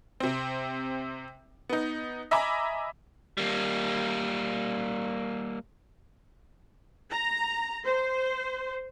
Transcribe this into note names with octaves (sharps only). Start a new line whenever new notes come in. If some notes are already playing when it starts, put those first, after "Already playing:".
C3 C4
B3 D#4
D#5 E5 G#5 A#5 B5 D6
G3 A#3
A#5
C5